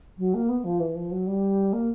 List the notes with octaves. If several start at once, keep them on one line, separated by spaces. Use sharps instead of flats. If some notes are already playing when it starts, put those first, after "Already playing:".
F#3
A#3
B3
F3
E3
F3
F#3
G3
A#3